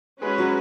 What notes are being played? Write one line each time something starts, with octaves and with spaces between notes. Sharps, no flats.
G#3 C#4 F#4 B4
F#3